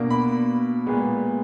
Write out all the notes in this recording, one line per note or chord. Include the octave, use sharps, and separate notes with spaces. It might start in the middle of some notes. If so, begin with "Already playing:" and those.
Already playing: B2 A#3 D4
B5
A#2 G#3 B3